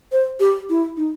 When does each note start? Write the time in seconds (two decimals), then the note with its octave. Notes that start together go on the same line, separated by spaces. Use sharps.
0.12 C5
0.40 G4
0.69 E4
0.97 D#4